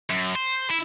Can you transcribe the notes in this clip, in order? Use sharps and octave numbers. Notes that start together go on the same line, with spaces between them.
F#2
C5
E4